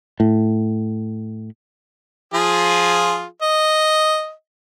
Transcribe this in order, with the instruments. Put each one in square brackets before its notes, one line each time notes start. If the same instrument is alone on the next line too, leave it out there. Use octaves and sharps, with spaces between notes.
[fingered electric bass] A2
[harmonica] F3 F4 G#4
D#5